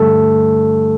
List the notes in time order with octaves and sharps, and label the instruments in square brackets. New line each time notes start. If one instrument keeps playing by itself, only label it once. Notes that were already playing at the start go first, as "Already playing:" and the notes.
Already playing: [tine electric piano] G2 D3 G3 A3 A4